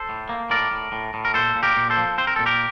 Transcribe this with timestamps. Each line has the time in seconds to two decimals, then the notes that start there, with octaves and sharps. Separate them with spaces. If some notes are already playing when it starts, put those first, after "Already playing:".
Already playing: A4 C5
0.09 A2
0.29 A#3
0.50 A2 A#4 D5
0.71 A2
0.92 A2
1.14 A2
1.25 A#4
1.34 A#2 A4 C5
1.55 A#2
1.63 G4 A#4
1.77 A#2
1.90 A4 C5
1.97 F3
2.18 C4 C5
2.27 A#4
2.36 A#2 A4
2.46 G4 A#4